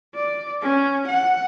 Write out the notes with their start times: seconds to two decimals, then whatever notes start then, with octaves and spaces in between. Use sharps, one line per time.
0.15 D5
0.62 C#4
1.08 F#5